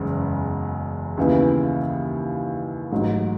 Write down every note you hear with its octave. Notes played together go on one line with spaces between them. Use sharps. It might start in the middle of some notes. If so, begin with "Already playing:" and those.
Already playing: F#1 E2 C#3 G#3
D#2 C#3 E3 B3 E4
A1 G#2 F#3